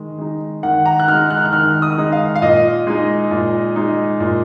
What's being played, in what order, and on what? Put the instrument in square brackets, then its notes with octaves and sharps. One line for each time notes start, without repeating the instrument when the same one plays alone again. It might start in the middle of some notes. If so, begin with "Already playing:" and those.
Already playing: [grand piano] D#3 G#3
G#3 D#4
D#3 F#5
A#5
F#6
G#3 D#4 F6
F#6
F6
F#6
D#3 F6
D#6
G#3 D#4
F5
F5
A#2 D#5
G#3 D#4
A#2
G#3 D#4
A#2